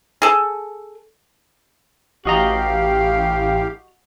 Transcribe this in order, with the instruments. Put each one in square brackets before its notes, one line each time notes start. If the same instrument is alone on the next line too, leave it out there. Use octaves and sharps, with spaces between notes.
[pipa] G#4 A4
[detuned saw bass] A1 [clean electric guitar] F#4 D#5 A#5 [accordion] G4 F5